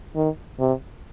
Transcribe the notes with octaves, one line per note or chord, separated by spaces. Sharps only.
D#3
C3